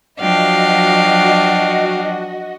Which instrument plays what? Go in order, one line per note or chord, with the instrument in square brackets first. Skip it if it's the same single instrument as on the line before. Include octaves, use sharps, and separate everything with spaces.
[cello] F3 F#3 [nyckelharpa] D4 [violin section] F#4 D#5 [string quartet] F5 G5